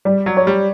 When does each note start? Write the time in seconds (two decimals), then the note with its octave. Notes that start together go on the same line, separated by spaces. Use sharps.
0.05 G3
0.26 F#3
0.37 C#5
0.47 G3